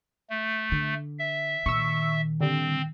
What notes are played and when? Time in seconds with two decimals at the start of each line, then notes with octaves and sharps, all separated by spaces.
0.30 A3
0.72 D3
1.19 E5
1.66 A#2 D#3 C#6 E6
2.41 D3 G3 C4